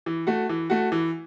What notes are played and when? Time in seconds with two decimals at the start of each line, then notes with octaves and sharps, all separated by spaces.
0.06 E3
0.27 A3 F#4
0.49 E3
0.70 A3 F#4
0.92 E3